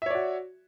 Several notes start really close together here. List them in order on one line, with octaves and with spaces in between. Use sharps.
E5 C#5 D5 F#4